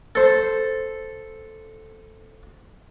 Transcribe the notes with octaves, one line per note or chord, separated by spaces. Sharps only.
A4 C5